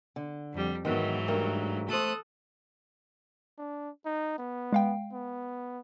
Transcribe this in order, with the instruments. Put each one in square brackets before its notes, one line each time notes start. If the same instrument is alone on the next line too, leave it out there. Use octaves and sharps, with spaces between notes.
[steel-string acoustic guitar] D3
[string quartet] F2 G3
[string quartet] G#2 E3 F#3 [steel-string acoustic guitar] D#3 B3
[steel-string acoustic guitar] G2 A3 A#4
[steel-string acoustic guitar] A3 C5 [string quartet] A4 D#6 F#6
[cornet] D4
D#4
B3
[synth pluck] G#3 F5 G5
[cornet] B3